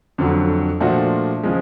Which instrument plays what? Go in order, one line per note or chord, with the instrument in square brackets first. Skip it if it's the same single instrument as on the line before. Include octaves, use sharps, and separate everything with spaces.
[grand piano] F2 D3 F#3
A#2 F3 A3 D4 F#4
C#3 F3 G#3